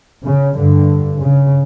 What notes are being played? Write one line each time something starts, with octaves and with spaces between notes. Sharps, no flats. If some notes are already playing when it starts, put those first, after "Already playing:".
C#3
G2 D3
C#3